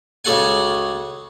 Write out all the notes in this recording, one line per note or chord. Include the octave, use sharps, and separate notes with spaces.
C#2 C#3 F#4 A4 F#5 G#5